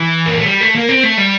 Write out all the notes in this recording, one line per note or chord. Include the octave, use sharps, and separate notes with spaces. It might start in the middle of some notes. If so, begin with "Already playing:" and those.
Already playing: E3
A#3
A3
G3
A3
A#3
C4
A3
G3